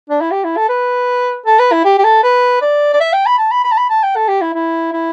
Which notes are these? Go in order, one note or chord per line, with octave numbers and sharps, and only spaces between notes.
D4
E4
G4
E4
A4
B4
A4
B4
E4
G4
G4
A4
B4
D5
D5
E5
G5
B5
A5
B5
B5
A5
B5
A5
G5
A4
G4
E4
E4
E4